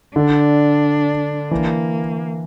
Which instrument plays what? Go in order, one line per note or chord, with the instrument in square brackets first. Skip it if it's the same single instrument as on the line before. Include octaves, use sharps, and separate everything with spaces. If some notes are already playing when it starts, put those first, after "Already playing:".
[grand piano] D3 [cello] D4
[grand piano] E3 [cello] A#3